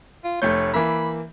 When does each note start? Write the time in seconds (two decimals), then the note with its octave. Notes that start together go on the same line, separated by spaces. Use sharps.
0.24 F4
0.42 F1 A3 C#5 G6
0.73 E3 A#3 E5 B5